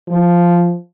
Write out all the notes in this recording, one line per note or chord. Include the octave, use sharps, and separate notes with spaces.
F3